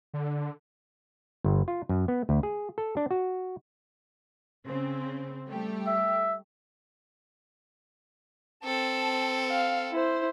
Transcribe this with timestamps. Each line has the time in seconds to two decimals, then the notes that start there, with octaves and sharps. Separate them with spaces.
0.14 D3
1.44 G1
1.68 F4
1.89 F#2
2.08 B3
2.29 D2
2.43 G#4
2.78 A4
2.97 D4
3.11 F#4
4.66 C#3 C4
5.47 G3 A3 G4
5.87 E5
8.64 C4 A4 A5
9.51 F5
9.92 E4 C5